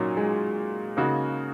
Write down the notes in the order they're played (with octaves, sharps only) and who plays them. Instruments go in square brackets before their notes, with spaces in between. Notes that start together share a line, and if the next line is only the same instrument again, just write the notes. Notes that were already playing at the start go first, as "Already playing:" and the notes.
Already playing: [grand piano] A#2 A#3 [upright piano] F#3 C#4 D#4
[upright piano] G#3
[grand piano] C#3 A#3 D#4 F#4